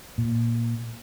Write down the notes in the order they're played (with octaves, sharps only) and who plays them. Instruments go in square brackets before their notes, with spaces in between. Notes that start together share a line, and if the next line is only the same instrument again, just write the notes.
[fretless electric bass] A#2